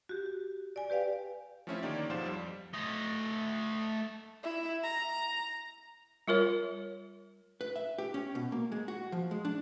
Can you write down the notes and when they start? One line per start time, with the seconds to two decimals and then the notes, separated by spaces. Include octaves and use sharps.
0.09 F#4 G4
0.26 G4
0.76 D5 G#5
0.90 G4 B4 D5 F5 G5
1.67 F3 A3 C4 C#4 E4 E5
1.83 D3 D#3 A#3 G4 C#5 D5
2.09 B1 G#2 F3 F4 C5 E7
2.26 F2 G3
2.74 A3 D#5
4.44 E4
4.83 A#5
6.28 G3 F4 A#4 C#5
7.61 B4
7.76 E5
7.98 G4
8.14 C#4
8.35 B2
8.52 A#3
8.72 G#3
8.88 F#4
9.12 F3
9.31 G#3
9.45 D4